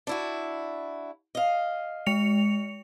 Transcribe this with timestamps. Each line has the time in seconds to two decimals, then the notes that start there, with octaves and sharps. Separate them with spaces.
0.07 D4 E4 F#4
1.35 D#5 F5
2.06 G#3 C#7 F7